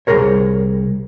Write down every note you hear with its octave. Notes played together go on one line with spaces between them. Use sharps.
C2 E3 G#4 A#4 C#5